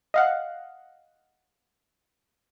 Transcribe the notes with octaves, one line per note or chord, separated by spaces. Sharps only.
D#5 F5 F#5